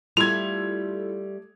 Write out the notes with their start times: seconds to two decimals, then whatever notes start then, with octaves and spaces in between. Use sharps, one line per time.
0.17 G3 A3 E4 F4 A4 G#6 F7